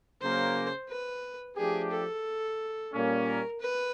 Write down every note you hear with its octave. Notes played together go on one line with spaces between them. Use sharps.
C#3 F#3 A#3 C5
B4
F3 A3 D4 G4 G#4
A4
A#2 G3 A#3 C#4
A#4
B4